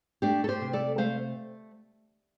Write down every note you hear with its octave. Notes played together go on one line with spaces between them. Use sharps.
A3 D4 G4
A4
G4 C5
C3
A4 D5
A3 C5 F5